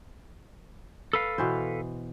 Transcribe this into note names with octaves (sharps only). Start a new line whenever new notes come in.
A4 B4 F5
B2 E3 C5